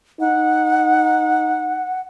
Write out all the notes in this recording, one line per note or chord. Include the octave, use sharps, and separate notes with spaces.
D#4 F#5